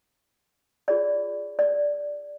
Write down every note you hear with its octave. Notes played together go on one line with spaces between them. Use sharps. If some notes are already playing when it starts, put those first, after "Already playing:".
F4 G#4 C#5 D5
D5